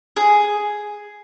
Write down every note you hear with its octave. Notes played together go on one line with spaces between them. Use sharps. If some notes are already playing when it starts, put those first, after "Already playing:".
G#4